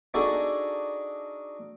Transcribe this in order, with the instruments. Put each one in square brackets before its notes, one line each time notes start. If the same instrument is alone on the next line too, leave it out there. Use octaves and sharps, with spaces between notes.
[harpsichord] D4 D#4 F#4 G#4 A4